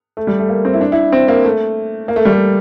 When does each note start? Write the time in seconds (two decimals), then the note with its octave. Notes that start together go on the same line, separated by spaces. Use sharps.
0.17 A3
0.27 G3
0.39 A3
0.49 A#3
0.65 C4
0.74 E4
0.81 D4
0.92 E4
1.12 C4
1.28 A#3
1.44 A3
2.08 A#3
2.16 A3
2.25 G3
2.33 A3